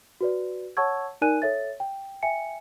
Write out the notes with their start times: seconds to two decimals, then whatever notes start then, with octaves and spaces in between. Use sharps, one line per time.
0.21 F#4 B4 D5
0.77 C#5 F#5 A5 C#6 E6 G#6
1.22 D#4 A#4 D5 G#5 F#6 D#7
1.42 A4 C#5 E5 A6
1.80 G5
2.23 E5 G5 G#5 C#7